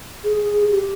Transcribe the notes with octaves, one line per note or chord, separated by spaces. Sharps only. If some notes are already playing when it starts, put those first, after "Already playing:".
G#4
G4